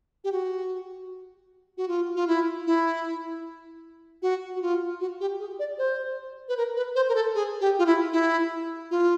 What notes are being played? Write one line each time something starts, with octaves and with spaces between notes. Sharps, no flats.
G4
F#4
F#4
F4
F4
E4
E4
F#4
F#4
F4
F#4
G4
G#4
D5
C5
B4
A#4
B4
C5
A#4
A4
G#4
G4
F4
E4
E4
F4